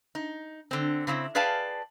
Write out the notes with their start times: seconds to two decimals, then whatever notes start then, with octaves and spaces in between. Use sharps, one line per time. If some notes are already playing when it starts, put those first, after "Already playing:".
0.15 D#4
0.71 D3 C4
1.07 C#3 C4 D#4 E4
1.35 G#4 B4 D5 F5 G5 A5